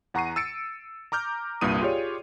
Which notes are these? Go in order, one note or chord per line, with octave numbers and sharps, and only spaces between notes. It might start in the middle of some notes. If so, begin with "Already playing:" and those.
E2 F#5 A#5 C#6 C7 D#7
E6 A6 C#7 D7
A#5 D6 F6 G6
C2 G2 A#2 A#3 D#6 D#7
F4 G4 G#4 C#5 D5